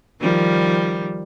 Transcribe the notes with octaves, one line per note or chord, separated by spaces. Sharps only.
D#3 F3 G3